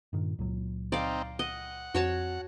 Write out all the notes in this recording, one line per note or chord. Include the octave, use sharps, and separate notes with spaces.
G2 A#2 D#3
C#2 A#2 F#3
C4 D#4 D5 F5
D#5 F#5
F2 C4 F#4 C#5 A5